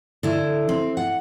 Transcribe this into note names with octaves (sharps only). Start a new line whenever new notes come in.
D3 E4
C4
F#5